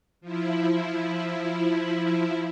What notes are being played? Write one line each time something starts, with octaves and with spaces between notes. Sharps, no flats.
F3 E4